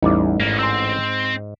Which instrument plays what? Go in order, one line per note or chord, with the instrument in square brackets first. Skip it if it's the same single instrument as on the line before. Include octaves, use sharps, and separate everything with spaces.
[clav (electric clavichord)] A1 D5 [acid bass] E2 [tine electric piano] G3 D#4 E4
[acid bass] G#2 [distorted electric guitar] A#3 B3
[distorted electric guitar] C4 [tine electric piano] C6 E6